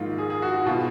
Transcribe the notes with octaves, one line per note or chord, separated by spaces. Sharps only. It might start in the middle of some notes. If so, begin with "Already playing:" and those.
Already playing: A#1 G#2 D#3 F4
G#4
G#4
F#4
F#4
B2 F4